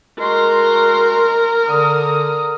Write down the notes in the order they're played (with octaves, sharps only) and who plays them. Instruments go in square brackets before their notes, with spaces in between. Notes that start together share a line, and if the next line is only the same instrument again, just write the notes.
[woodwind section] G#3 F#4 C6 [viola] A#4
[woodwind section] D3 D#6